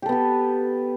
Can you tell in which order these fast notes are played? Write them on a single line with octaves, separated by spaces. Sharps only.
G4 A4 B3 B4